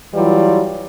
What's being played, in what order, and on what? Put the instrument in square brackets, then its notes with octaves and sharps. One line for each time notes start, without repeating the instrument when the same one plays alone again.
[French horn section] E3 F#3 G3 E4 F4